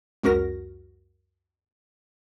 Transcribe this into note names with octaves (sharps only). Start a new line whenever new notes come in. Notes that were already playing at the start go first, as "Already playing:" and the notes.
C#2 F#2 F#4 A#4 A#6